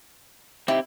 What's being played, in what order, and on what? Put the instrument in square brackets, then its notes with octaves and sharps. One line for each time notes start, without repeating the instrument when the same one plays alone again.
[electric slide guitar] C4 D#4 G4 [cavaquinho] E4